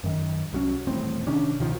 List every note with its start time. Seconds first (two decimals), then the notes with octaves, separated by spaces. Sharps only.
0.04 F#2 D#3
0.53 C2 F#3 C#4
0.87 D#1 E2 A2 C4
1.27 C3 D#3 C#4 D4
1.59 C#2 B2 D#3 F3